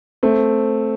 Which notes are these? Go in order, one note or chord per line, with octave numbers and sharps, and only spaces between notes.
A3 C4